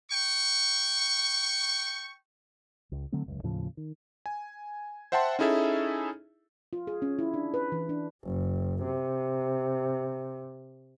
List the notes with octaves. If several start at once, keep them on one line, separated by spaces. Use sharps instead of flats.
G5 C#6
C#2
D3 F#3 A3 C4
F1 C#2 F#2
D#2 A2 C#3 F3
D#3
G#5
C5 E5 F#5 G5 A5 C6
C#4 D#4 E4 G#4 A4 E5
F4
G#4
C#4
E4
D4
B4
E3
D4
F#1
C3